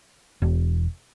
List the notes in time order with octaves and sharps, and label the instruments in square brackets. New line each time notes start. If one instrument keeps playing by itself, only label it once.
[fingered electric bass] E1